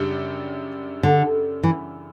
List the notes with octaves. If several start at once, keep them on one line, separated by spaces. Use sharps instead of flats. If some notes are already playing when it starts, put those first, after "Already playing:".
Already playing: F#2 C#3 G3 D4 G4
D3
E3